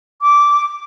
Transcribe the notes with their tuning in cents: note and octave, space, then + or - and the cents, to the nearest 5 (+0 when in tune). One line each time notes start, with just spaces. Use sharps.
D6 -10